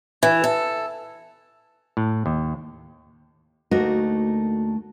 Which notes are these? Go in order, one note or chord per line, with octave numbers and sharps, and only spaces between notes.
E3
A4
A2
D#2
D2 A3 A#3 D#4 F#4 A#4